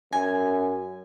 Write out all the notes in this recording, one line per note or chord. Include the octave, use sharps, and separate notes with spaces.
F#2 G#5